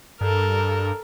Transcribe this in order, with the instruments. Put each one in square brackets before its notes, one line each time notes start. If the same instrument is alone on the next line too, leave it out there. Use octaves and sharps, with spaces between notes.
[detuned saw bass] G2 [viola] A4 A#4